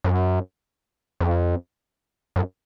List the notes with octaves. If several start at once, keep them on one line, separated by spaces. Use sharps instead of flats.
F#2
F2
F#2